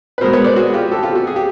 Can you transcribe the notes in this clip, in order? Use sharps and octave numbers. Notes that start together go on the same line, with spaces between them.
B4
B2 G#3 B3 A#4 C5
B4 C#5
C5 D5
F#4 G#4
F4 G4
G4 A4
F4 G4
F#4
G#4
G4